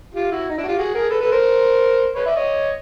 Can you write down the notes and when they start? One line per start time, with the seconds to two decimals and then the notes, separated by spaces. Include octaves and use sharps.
0.15 F4 G4
0.31 E4 F#4
0.50 D#4
0.57 D4 E4
0.63 F#4
0.68 F4 G4
0.78 F#4 G#4
0.94 G#4 A#4
1.10 A4 B4
1.20 A4 B4
1.31 A#4 C5
2.15 B4 C#5
2.26 D5 E5
2.36 C#5 D#5